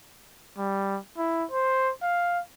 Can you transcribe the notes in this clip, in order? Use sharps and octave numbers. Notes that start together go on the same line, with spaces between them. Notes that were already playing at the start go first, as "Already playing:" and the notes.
G3
E4
C5
F5